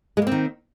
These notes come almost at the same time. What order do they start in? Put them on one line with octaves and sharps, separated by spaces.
G#3 A#3 C4 D#3